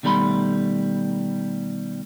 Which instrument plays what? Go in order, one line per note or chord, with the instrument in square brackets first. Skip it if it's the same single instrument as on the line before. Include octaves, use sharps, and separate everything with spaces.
[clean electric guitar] B2 D#3 G3 A3 B5 C6